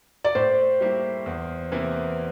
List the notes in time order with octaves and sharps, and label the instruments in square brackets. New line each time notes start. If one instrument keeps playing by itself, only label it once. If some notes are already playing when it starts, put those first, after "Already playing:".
[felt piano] D5
[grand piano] A2 [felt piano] C5
[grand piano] G3 A#3 E4
E2
C3 E3 A#3 E4